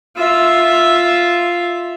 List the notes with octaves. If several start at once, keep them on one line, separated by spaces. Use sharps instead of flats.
F4 E5